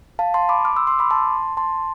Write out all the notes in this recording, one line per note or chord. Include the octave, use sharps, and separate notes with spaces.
F5 A5
A5 C6
B5 D6
D6 F6
C6 E6
C6 E6
B5 D6
A5 C6
A5 C6